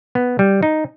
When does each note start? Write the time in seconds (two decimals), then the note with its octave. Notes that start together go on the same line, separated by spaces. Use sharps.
0.15 B3
0.39 G3
0.63 D#4